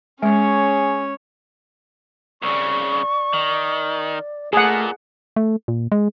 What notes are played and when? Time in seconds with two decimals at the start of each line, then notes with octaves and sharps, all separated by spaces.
0.23 G#3 C#4 G#4 C#5
2.42 C2 C#3 D5 C#6
3.33 D#3
4.53 A#2 A3 G#4 F#5
5.36 A3
5.68 A#2
5.92 G#3